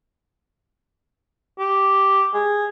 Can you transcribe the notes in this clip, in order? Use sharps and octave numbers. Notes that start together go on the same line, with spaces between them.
G4
G#4